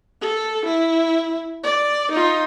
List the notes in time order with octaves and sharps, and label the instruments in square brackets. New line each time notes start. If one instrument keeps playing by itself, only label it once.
[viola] A4
E4
D5
D#4 F4